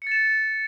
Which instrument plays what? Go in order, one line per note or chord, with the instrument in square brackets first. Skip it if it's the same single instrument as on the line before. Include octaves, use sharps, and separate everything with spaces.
[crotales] C#7
A6
E7